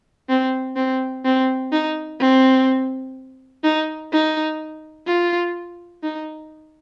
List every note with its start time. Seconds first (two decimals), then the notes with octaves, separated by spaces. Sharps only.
0.29 C4
0.76 C4
1.25 C4
1.72 D#4
2.20 C4
3.64 D#4
4.12 D#4
5.07 F4
6.04 D#4